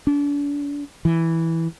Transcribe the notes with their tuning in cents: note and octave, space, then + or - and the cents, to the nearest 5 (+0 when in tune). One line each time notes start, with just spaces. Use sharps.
D4 -40
E3 -5